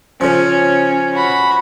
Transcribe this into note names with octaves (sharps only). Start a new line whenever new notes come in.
C#3 F3 C#4
F#4 B5